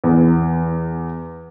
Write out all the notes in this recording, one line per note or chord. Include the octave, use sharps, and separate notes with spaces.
E2